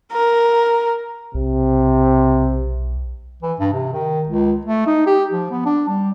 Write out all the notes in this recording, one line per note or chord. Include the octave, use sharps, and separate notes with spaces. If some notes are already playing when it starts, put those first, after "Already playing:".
A#4
B1 C3
E3
G2
C3
D#3
C#2
A3
D#4
G4
F3
B3
D4
G3